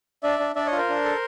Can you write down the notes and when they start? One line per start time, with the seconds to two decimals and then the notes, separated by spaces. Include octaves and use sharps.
0.23 D4 D5 E5
0.40 D4
0.55 D4 D5 E5
0.66 C#5 D#5
0.72 F4
0.78 A#4 C5
0.89 D4
1.05 A4